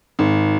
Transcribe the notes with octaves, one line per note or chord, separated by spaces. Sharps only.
G#1